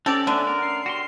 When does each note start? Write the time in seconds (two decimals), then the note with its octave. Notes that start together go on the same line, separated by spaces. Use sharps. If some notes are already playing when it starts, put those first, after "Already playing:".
0.06 C4 C#4 G4 A4 D5
0.27 D3 A3 B3
0.47 A#4
0.62 C7
0.86 F#4 G4 C6